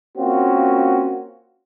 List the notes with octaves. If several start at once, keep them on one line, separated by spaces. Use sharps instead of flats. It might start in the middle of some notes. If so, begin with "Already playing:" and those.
A#3 C4 C#4 F4 F#4